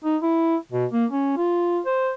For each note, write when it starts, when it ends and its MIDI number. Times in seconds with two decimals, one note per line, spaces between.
0.04 0.17 63
0.22 0.56 64
0.72 0.86 47
0.91 1.05 58
1.11 1.34 61
1.37 1.81 65
1.86 2.13 72